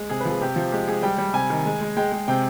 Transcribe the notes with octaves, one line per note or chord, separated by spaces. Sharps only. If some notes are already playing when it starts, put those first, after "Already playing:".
Already playing: G#3
C3 G#4
B4
F3
G#4
C3 G4
F3
G#3 G4
G#3 G#4
G3 G5
G3
C3 G#5
D#3
G#3
G#3
G#3 G5
G#3
C3 G5